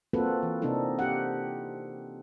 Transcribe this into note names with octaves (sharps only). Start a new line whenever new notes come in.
A#3 C4 F4 F#4 A4 B4
E3
C3 A#3 C4 D4 D#4 A4
G4 F#5